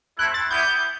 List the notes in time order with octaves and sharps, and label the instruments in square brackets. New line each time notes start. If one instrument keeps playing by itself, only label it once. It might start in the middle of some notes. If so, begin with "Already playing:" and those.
[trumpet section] A3 C4 E4 [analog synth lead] F#6
[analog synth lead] A6
[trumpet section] G3 B3 E4 [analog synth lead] G6